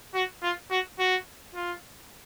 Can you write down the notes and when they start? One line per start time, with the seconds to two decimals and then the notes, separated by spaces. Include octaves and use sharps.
0.15 F#4
0.43 F4
0.71 F#4
0.99 F#4
1.55 F4